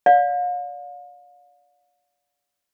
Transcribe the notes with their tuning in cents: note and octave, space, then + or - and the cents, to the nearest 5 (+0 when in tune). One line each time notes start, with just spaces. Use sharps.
D5 -30 F5 +40